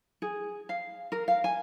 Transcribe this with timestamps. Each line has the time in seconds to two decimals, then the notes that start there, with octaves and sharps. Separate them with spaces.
0.22 G#4
0.69 F5
1.12 A#4
1.28 F5
1.44 G#5